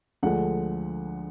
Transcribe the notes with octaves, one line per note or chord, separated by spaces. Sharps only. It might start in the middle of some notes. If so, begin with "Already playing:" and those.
D2 D3 F3 G#3 F#5